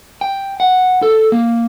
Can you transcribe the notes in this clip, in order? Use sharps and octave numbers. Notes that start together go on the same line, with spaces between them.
G5
F#5
A4
A#3